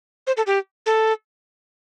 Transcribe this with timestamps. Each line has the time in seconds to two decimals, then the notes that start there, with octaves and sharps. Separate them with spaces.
0.27 C5
0.37 A4
0.47 G4
0.86 A4